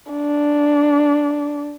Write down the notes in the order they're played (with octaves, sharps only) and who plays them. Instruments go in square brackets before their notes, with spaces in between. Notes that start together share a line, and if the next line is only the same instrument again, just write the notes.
[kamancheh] D4